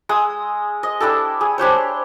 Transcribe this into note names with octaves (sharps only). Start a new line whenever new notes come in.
G#3 D#6 E6
D#5
D4 E4 G4 A4
G#4
D4 G4 C5 C#5